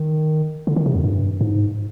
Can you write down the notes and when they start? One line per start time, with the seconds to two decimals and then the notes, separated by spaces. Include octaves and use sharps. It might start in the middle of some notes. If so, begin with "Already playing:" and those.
Already playing: D#3
0.67 D3
0.76 D#3
0.86 C3
0.94 F2
1.04 G2
1.41 G#2